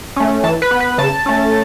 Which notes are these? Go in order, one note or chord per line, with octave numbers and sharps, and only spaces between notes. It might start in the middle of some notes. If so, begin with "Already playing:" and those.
A3 C#4
E3 A5
B4
B3
B4
C#3 A5
A3 C#4